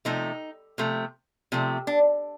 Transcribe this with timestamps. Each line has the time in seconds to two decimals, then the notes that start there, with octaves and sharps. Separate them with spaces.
0.05 C3 F3 A3 D#4
0.78 C3 F3 A3
1.52 C3 F3 A3
1.87 D4